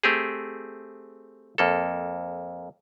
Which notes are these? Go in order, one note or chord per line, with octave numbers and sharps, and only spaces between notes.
A3 C4 G4 G#4
F2 A#3 A4